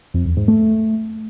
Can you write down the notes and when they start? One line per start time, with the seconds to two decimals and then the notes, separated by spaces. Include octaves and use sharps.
0.14 F2
0.25 E2
0.37 G#2
0.48 A3